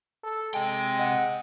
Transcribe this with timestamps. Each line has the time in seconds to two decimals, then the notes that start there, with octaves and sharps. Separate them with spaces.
0.24 A4
0.54 C3 G#3 G5 G#5
0.99 D#5 F#5